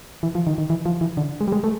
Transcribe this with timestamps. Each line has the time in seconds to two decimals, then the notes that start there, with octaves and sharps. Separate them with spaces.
0.23 E3
0.35 F3
0.47 D#3
0.58 D#3
0.70 E3
0.86 F3
1.01 E3
1.17 D3
1.41 G#3
1.48 G3
1.52 G#3
1.64 A3